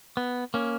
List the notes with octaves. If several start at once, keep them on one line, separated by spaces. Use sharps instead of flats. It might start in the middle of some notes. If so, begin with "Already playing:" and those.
B3
A#3 C#4